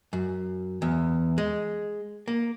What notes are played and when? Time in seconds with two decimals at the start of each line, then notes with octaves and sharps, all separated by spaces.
0.13 F#2
0.82 E2
1.38 G#3
2.28 A#3